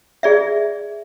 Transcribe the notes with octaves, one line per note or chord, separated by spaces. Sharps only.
G#4 D5 E5